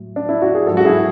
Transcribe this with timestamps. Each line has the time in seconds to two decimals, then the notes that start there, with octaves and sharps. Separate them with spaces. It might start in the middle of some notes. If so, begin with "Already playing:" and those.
Already playing: A2 F#3
0.16 D4
0.29 E4
0.42 F#4
0.55 G#4
0.66 G#2 F#3 F#4 A4
0.77 F#4
0.85 E4 G#4